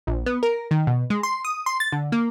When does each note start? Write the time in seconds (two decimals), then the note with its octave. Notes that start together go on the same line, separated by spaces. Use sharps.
0.07 A#1
0.26 B3
0.43 A#4
0.71 D#3
0.87 B2
1.10 G#3
1.23 C6
1.45 D#6
1.66 C6
1.80 A6
1.92 D3
2.12 A#3